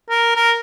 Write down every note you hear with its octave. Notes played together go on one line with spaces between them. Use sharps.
A#4
A#4